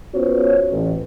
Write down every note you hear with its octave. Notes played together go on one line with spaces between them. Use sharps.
B3 C#4 F4 F#4 C5 C#5
A1